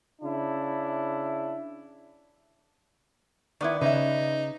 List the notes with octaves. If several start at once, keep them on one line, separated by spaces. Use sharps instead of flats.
C#3 D4 E4
D#3 B3 E4 D5
C#3 D#4 B4 E5